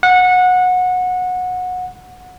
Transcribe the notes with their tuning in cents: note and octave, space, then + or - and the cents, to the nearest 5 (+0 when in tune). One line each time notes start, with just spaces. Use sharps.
F#5 -20